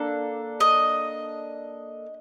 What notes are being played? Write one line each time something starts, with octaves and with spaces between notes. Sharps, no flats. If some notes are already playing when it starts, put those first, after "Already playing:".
Already playing: A#3 D4 A4
D#5